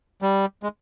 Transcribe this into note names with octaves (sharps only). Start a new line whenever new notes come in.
G3
G#3